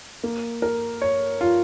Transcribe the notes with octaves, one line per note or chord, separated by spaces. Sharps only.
A#3
A#4
C#5
F4